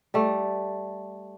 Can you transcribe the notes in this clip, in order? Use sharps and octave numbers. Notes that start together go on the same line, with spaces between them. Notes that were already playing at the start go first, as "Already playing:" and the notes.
G3 A3